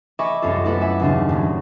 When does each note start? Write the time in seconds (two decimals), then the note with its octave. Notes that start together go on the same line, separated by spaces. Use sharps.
0.19 D#5 E5 G#5 B5 C#6 D6
0.42 C2 F#2 C4 F4 A4
0.64 A3 B3 E4 A4 B4
0.81 E5 F#5 G#5 D6
1.00 D#2 A2 C#3 C4 D4
1.29 D#1 A2 F#3